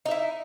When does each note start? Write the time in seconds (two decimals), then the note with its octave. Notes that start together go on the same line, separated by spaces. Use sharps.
0.06 D#4
0.08 E5
0.11 E4